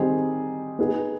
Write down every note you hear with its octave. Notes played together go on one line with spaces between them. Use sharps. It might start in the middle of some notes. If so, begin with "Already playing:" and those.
Already playing: D#3 G3 C4 D#4 G#4
B3 D#4 G#4